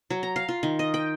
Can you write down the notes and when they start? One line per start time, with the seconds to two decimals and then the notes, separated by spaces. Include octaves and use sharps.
0.10 F#3
0.23 A#5
0.36 F5
0.49 F4
0.63 D#3
0.79 D#5
0.94 G5